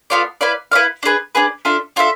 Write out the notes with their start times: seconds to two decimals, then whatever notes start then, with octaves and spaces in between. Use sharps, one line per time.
0.10 B3 F4 A4 D5
0.41 E4 B4 D5 F5
0.72 E4 B4 D5 F5
1.03 D4 G#4 B4
1.35 D4 G#4 B4
1.65 D4 F4 A4 E5
1.96 D4 F4 A4 E5